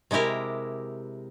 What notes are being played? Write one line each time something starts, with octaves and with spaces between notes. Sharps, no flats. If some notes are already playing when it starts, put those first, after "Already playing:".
C3 G#3 E4 G4 A#4